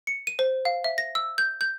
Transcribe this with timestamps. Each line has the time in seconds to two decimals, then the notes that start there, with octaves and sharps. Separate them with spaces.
0.07 C#7
0.27 D#7
0.39 C5
0.65 F5
0.84 E5
0.98 A#6
1.15 E6
1.38 G6
1.61 G6